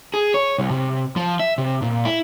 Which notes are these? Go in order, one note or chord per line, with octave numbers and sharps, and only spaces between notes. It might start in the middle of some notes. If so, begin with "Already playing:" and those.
G#4
C#5
C2
C3
F3
E5
C3
A#2
E4